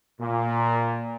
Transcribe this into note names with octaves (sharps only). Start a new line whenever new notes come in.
A#2